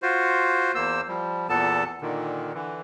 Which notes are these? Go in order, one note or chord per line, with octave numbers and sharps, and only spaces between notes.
F4 F#4 C5
E2 A#3 C5 E6
F3 G3
E2 A#2 B3 A4 A5
A#2 D3 D#3
D3 E3